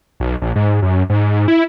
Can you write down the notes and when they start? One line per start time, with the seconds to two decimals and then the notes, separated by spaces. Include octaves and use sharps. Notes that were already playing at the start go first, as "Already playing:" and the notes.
0.20 B1
0.42 A#1
0.56 G#2
0.82 F#2
1.10 G#2
1.48 E4